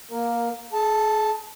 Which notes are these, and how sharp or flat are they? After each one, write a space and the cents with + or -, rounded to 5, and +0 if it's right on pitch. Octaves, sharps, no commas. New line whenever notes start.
A#3 +15 A#4 +0
G#4 +35 A5 +0